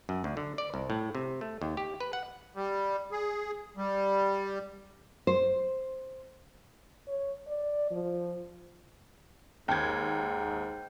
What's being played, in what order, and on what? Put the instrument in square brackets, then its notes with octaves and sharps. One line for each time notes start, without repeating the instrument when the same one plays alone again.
[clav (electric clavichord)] F#2
D2
D3
D5
C2
A2
C3
A3
D#2
G4
B4
F#5
[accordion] G3
G#4
G3
[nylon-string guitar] C5
[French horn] C#5
D5
F3
[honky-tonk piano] D#2 G#6 [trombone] G#2 [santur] G5